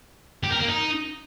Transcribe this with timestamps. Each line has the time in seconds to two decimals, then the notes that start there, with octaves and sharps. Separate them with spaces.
0.44 G4
0.52 A#4
0.60 A#3
0.68 D#4